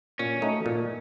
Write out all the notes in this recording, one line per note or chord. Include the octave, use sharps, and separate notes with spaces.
A#2 C#4
A3 D#4 F#4
A#2